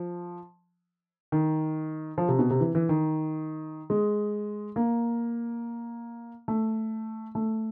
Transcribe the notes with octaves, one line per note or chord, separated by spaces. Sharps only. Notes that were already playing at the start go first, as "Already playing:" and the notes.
Already playing: F3
D#3
F3
C3
B2
C3
E3
E3
D#3
G#3
A#3
A3
A3